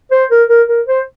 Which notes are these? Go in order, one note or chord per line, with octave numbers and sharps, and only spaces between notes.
C5
A#4
A#4
A#4
C5